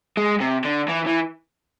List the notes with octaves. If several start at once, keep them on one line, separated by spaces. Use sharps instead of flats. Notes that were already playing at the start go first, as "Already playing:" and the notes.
G#3
C3
D3
E3
E3